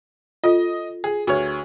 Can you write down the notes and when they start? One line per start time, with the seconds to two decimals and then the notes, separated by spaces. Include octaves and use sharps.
0.44 F4 A4 D#5 D#6
1.04 G#4
1.27 D2 F#4 G#4 B4 C#5